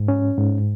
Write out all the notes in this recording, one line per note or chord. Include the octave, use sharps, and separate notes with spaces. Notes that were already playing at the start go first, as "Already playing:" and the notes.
Already playing: G#2
C#4
G#2